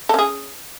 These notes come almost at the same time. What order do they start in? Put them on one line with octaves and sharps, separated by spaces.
A4 C#4 G#4